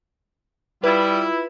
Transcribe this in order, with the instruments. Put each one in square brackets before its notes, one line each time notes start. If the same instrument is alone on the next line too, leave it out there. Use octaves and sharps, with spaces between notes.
[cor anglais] G3 [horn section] E4 [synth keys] F4 B4